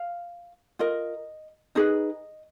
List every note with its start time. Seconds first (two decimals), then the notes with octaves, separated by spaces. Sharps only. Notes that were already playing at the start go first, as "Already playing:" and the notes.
Already playing: F5
0.79 F4 A#4 D#5
1.75 D#4 G#4 B4 D#5